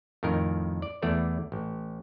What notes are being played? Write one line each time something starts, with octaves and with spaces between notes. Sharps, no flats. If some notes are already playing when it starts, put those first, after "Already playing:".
F2 A2 D#3 A#4
D5
E2 E3 A3 D5
A1